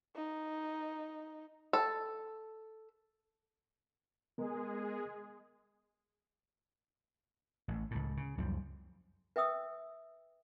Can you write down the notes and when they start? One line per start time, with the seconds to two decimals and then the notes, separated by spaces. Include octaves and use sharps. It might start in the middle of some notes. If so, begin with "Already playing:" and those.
0.16 D#4
1.73 A4
4.38 G#3 B3 G#4 A#4
7.68 A1
7.91 C#2 A2
8.17 C#3
8.37 C#2 F#2 F3 G3
9.36 B4 E5 G5 D#6 E6